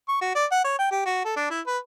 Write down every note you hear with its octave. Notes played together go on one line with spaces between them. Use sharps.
C#6
F#4
D5
F#5
C#5
G5
G4
F#4
A4
D4
E4
B4